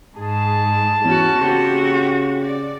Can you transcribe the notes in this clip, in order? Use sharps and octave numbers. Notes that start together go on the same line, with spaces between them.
G#2 G#4 A5
E2 C#4 F#4
C#3 A#3 C4 F#4 G4
D5